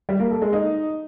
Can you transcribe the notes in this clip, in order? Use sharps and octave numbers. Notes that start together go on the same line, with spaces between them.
G3
A#3
A4
G#3
D#4